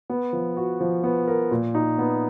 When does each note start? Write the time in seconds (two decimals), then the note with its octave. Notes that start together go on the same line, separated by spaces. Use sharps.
0.10 B3
0.33 F3
0.57 F#4
0.81 F3
1.04 B3
1.28 A#4
1.51 A#2
1.75 D#4
1.98 B3